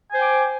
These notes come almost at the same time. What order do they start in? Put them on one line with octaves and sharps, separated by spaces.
G#5 C5 G5 D6